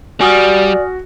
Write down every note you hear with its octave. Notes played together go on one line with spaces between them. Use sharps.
G3 F#4 D5 G#5 D#6 F6